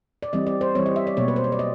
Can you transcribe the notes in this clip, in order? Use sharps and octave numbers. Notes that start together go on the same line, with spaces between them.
D5
E3 G3 C4 D#5
D5
C5
E3 G3 C4 C#5
D#5
E5
D5
B2 F#3 A#3 C#5
B4
C5
C#5
D5
D#5